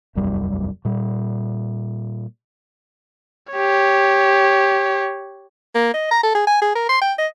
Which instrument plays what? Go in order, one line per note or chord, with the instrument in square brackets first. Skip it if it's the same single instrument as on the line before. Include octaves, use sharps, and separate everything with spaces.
[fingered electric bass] E1 C2 F#2 G3
A#2 G3
[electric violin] G4 C#5
[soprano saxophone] A#3
D#5
A#5
A4
G#4
G#5
G#4
A#4
C6
G5
D#5